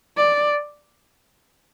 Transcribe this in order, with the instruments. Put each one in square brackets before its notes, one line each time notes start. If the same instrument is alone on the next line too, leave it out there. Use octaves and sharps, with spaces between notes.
[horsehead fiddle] D5